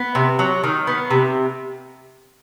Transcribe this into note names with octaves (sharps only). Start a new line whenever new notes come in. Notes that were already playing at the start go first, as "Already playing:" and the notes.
Already playing: B3
C3
F#3
D#3
B3
C3